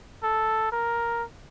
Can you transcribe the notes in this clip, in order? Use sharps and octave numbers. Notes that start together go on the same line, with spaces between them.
A4
A#4